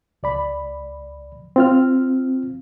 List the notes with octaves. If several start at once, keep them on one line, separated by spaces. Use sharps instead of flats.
C#2 D5 B5
C4 F4 F6